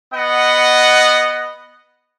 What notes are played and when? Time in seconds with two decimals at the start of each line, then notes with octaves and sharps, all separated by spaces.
0.14 B3 D#5 F#5